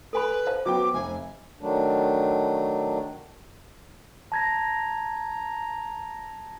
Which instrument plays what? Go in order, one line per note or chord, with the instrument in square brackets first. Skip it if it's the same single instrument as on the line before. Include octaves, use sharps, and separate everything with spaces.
[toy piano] A4 G#5 B5 [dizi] B4
[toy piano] C5 F5 A5
[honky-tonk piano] F#3 B3 G5 [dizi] D6
[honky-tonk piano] F1 [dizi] G#5
[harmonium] D#3 F#3 A3 D4
[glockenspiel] A5 G#6 A#6 [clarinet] A#5